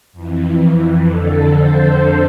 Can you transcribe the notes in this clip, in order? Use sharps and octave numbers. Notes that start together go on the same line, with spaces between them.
F2 E3
F2 D3 A4
C5